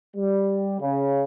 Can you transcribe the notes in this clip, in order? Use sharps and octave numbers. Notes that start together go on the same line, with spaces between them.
G3
C#3